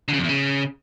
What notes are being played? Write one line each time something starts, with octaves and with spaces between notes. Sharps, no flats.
D3
C#3
F2
E2
C#3